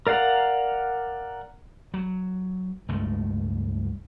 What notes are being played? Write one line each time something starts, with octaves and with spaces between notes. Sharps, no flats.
A#4 D5 F5 F#5 A#5
F#3
C#2 G2 G#3 A3